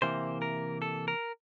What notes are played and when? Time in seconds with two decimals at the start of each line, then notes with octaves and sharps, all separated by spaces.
0.02 C3 E3 A#3 C5
0.42 A#4
0.82 A4
1.08 A#4